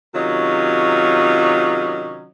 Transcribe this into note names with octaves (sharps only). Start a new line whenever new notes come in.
C3 D#3 F#3 C#4 D#4 F4